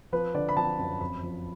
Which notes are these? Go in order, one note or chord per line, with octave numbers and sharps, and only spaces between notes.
F3 B4
D3 D5
B5
F3 A5
F#2
F2 B5
F3